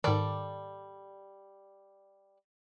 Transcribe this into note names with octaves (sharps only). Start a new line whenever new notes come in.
G#2 D#3 G3 A4 D5